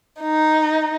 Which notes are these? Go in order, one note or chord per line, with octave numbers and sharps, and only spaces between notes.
D#4